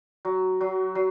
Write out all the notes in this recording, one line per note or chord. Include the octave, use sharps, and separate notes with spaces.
F#3
F#3
F#3